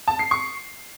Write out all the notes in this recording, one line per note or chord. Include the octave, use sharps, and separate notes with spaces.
A5
C7
C#6